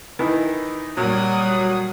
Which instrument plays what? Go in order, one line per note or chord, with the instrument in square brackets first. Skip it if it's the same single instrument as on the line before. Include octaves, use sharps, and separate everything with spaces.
[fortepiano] D#3 E3 [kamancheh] D#4
[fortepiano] A#2 [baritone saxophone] F#3 [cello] G3 [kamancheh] F#5 D#6